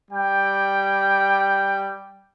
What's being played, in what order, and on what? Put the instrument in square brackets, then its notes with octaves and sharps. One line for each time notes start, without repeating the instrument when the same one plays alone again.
[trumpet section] G3 G5